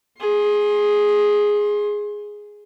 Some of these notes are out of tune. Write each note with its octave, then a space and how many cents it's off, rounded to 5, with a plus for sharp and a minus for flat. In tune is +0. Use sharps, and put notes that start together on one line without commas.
G#4 +0 C6 +25